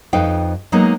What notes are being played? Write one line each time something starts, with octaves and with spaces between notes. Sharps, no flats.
F2 D#4 B4 F5 G5
F#3 G#3 A#3 B3 D#4